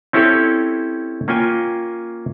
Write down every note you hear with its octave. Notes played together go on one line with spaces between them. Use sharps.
C4 C#4 E4 G4 A4 C#5
A#3 C#4 F4 G5 G#5